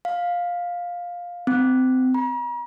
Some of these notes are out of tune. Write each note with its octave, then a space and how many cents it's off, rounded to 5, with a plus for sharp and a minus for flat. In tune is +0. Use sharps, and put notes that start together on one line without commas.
F5 +10
C4 -25
A#5 +45